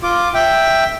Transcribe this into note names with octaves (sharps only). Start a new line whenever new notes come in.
F4 D6
E5 G5